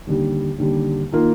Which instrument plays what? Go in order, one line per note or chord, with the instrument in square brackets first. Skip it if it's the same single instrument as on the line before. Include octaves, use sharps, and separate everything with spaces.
[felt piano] D#2 D3 G3
D#2 D3 G3
D#3 A#3 F4